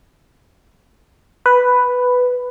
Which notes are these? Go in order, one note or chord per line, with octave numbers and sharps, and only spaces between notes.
B4